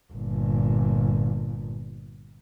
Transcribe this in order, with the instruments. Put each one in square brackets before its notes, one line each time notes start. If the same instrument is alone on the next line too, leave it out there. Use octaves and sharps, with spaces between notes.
[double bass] G1 A#2